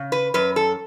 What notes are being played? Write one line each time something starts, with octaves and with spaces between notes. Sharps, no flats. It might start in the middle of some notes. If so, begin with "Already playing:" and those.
Already playing: C#3
B4
F#2 B4
A4